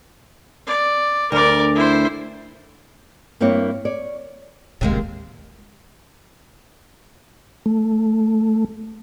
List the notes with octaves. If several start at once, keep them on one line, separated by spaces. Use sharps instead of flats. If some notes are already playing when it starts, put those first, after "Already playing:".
D5
D2 A#4 D5
E4 C5
G2 A#3 C4 E4 C#5
C#5 D5
D1 A1 D#2 C3 G#3 A#3
A3